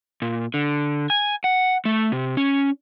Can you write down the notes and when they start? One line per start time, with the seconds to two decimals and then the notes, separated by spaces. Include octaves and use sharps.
0.22 A#2
0.54 D3
1.10 G#5
1.44 F#5
1.85 A3
2.12 C3
2.37 C#4